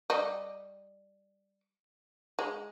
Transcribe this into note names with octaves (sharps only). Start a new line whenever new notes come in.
G3 D#5
G#3